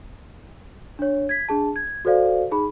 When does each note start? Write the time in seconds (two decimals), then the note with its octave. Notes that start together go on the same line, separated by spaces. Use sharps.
0.99 D4 C#5
1.29 G#6 B6
1.49 D4 G#4 A5
1.76 G#6
2.05 F#4 A4 C5 D5 F5
2.51 D#4 G#4 B5